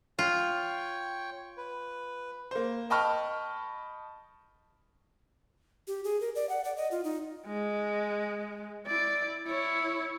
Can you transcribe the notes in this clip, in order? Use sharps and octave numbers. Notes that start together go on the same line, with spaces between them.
F4 C#5 G5
B4
A#3 C5
D#5 G5 A5 B5 C#6 F6
G4
G#4
A#4
D5
F#5
D5
D#5
F4
D#4
G#3
E4 D5
E4 C#5